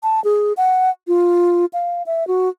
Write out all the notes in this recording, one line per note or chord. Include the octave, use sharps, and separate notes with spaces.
A5
G#4
F#5
F4
F5
E5
F#4